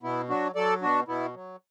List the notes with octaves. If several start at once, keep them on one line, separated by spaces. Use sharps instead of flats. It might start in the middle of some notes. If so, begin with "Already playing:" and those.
B2 B3 E4
F#3 D4 F#4
F#3 A4 D5
B2 D4 F#4
B2 B3 E4
F#3